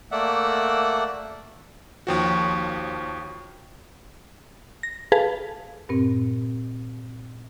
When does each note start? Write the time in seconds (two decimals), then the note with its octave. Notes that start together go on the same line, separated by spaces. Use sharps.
0.12 A3 A#3 D5 E5 F#5
2.07 D#2 F3 F#4 C#5 G5 C#6
4.83 A#6
5.12 G#4 A4 B4 F5 A5
5.89 G2 A#2 C4